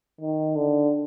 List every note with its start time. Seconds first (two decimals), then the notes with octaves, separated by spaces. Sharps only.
0.21 D#3
0.56 D3